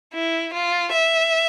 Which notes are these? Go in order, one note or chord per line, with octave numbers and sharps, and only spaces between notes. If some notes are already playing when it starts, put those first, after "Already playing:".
E4
F4
E5